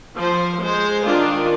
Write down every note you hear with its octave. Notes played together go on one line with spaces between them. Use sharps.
F3 C5
G#3 C5
D#3 D4 F4